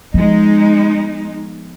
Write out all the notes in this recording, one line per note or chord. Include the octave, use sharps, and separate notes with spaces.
F3 G#3 B3 D#4